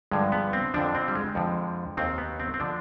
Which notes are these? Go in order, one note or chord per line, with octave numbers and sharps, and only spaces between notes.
G2 D3 F3 G#3
B3
C4
F2 D3 F3 D4
C4
G3
G#3
F2 D3 F3
D#2 D#3 C4
B3
C4
C4
D3 F3 D4